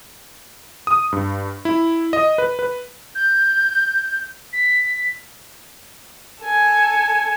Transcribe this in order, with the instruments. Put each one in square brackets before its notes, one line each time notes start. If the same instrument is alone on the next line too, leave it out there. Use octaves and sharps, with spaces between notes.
[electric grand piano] D#6
G2
E4
D#5
B4
B4
[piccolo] G6
B6
[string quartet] A4 G#5